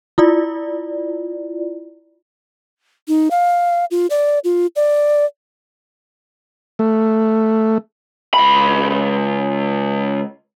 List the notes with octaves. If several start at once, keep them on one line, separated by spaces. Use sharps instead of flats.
E4 F4 D5
D#4
F5
F4
D5
F4
D5
A3
C#2 B5